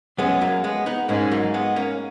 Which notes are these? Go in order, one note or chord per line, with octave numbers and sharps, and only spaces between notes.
F#2 G#3 B3
F#3 A#3
G#3 B3
B3 D#4
G#2 A#3 C#4
F#3 A#3
G#3 B3
A#3 C#4